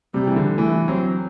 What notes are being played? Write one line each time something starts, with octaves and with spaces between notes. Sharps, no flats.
C3 G3
E3
D3
E3 A3
F#3 C4